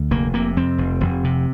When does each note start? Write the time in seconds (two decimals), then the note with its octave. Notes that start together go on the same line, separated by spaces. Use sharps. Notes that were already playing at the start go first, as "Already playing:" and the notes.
Already playing: D2
0.11 F1 A#3
0.34 C3 A#3
0.57 F2 C4
0.78 F1
1.01 F1
1.24 C3